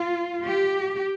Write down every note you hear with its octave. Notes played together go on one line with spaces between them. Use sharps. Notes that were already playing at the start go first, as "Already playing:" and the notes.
Already playing: F4
G4